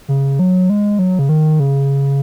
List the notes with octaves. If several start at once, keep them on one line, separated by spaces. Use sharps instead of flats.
C#3
F#3
G#3
F#3
C#3
D#3
C#3